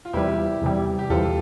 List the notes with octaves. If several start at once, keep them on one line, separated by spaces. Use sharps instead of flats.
F4
E2 C3 G3 E4 G4
E2 C3 G3
G4
E2 C3 G3 F4 A4